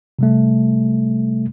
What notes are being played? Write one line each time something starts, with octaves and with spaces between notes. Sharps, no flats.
C3 G3 A3